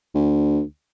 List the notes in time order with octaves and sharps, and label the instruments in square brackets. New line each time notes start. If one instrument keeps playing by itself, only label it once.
[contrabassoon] D2